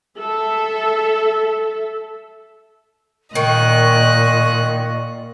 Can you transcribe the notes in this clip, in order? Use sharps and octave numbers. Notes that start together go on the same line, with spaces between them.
A4 E5
A#2 D#3 D#5 C#6 F#6